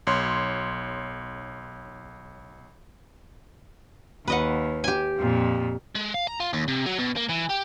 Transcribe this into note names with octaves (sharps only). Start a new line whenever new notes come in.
B1 C#5 C6
D#2 B4 D#5 F#5
G4 G#5
F2 A#2
G#3
F5
A#5
F4
D#2
C3
F#3
B2
A#3
E3
G4